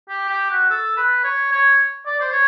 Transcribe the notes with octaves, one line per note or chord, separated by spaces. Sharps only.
G4
G4
F#4
A4
B4
C#5
C#5
D5
C5
C#5